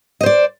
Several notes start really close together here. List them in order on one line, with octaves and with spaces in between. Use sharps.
D#5 C5 D5